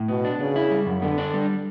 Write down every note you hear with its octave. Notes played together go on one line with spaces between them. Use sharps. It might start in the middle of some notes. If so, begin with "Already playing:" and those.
Already playing: A2
B2 B3
D4
C#3 B3
E4
G3
F#2
D3 B3
D4
G3